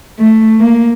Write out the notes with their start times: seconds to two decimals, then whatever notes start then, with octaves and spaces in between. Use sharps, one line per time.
0.19 A3
0.60 A#3